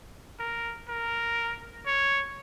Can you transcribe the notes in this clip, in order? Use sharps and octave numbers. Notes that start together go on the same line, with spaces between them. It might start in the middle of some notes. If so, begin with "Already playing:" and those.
A#4
A#4
C#5